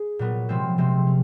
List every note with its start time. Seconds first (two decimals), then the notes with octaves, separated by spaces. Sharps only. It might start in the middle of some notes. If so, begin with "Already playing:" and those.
Already playing: G#4
0.19 A#2 F#3 B3
0.49 C3 F3 G#3 C4
0.78 C3 F3 G#3 C4
1.07 C#4